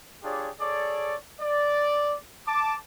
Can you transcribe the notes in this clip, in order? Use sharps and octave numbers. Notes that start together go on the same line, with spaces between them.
D4 F4 G4 G#4 C#5 D5
G#4 A4 C#5 D5
D5
A5 D6